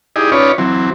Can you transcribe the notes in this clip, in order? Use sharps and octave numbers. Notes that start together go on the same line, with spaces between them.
D#4 E4 G4 G#4 D5 D#5
C#4 D#4 F4 B4 C#5 D5
E3 F#3 C4